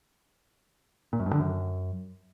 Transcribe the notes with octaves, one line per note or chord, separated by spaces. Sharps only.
A#2
F#2
G2
D3
F#2